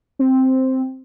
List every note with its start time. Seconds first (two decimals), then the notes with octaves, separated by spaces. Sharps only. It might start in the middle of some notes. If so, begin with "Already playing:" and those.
0.19 C4